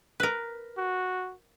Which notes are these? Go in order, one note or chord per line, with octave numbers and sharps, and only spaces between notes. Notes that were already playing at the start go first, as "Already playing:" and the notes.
A#4 B4
F#4